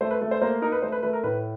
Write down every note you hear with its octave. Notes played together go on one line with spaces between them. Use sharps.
A3 C5
B4
A3
C5
A#3 C5
D#4 A#4
B4
A3 C5
B4
A3 B4
A#4
A2 B4